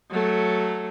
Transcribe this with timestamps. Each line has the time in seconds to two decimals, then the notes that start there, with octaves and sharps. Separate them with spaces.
0.10 F#3 A3